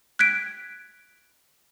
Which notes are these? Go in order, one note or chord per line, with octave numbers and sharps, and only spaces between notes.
F#6 G#6 B6 D7